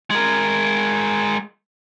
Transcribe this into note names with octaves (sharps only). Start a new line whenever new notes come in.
G#3 A#4